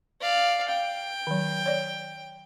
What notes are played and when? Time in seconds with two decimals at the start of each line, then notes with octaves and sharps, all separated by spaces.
0.21 D5 F5
0.69 F5 G5
1.27 D#3 F#3
1.66 C#5 D5